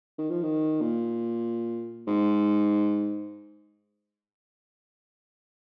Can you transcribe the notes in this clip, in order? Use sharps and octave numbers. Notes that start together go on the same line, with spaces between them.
D#3
F3
D#3
A#2
G#2